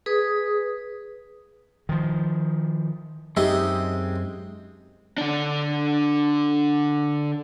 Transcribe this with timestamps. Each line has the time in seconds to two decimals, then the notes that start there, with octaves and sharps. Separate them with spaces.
0.06 G#4 B4 D#6
1.89 D#3 F3
3.37 F#2 G#3 C4 D#4 G4 E5
5.18 D3 D4